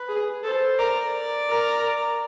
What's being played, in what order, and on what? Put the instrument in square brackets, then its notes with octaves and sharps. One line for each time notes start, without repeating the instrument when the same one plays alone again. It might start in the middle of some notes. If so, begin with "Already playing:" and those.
Already playing: [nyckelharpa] B4
[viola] G#4
[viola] A4 [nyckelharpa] C5
[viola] A#4 [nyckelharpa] D5
[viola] A#4